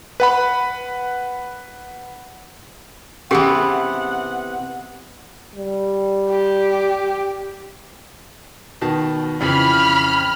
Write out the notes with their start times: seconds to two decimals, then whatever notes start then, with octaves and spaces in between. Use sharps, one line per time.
0.20 B4 F#5 B5
3.31 C3 E3 B3 C#4 G4 G#4 F#5
5.56 G3
6.30 G4
8.81 B2 D#3 A5
9.41 F2 C#3 E3 B5 F6